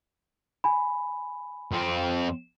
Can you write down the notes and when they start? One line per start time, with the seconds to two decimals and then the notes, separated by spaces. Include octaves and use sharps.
0.64 G#5 B5
1.71 F2 C4